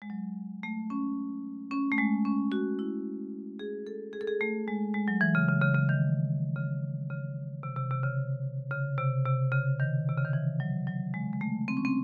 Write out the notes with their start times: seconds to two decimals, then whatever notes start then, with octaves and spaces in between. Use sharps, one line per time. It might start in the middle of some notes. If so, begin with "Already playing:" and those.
0.02 G#3
0.10 F#3
0.63 A3
0.90 C#4
1.71 C#4
1.92 A3
1.98 G#3
2.25 C#4
2.52 F#4
2.79 E4
3.59 G#4
3.87 A4
4.13 G#4
4.21 A4
4.27 G#4
4.41 A3
4.68 G#3
4.94 G#3
5.08 F#3
5.21 E3
5.35 C#3
5.49 C#3
5.62 C#3
5.75 C#3
5.89 D#3
6.56 C#3
7.10 C#3
7.63 C3
7.77 C3
7.91 C3
8.04 C#3
8.71 C#3
8.98 C3
9.26 C3
9.52 C#3
9.80 D#3
10.09 C3
10.18 C#3
10.25 D#3
10.33 E3
10.60 F#3
10.87 F#3
11.14 G#3
11.33 G#3
11.41 A3
11.68 C4
11.77 C#4
11.85 C4